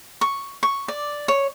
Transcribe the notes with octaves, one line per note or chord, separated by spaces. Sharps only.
C#6
C#6
D5
C#5